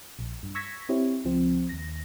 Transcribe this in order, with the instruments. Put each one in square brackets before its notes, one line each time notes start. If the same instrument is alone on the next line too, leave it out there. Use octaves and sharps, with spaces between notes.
[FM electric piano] A#1
G2
C#6 E6 G#6 A#6 B6
C4 E4 G4 C#5
C#2 F3 C4
D#2 A#6